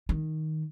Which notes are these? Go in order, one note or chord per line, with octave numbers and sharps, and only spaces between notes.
D#3